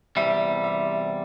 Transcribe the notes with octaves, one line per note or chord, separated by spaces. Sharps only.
E2 C3 G3 E5
E5